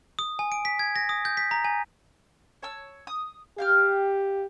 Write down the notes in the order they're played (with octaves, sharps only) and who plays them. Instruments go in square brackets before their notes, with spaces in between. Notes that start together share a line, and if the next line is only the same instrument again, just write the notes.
[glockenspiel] D#6
G#5
D7
B6
G#6
A#6
D#6
G6
B6
A#5
G#5
[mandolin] C#5 A5 E6
D#6
[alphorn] G4 [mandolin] F5 G5 F6